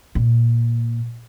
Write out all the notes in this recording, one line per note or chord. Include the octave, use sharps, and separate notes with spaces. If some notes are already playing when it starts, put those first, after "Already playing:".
A#2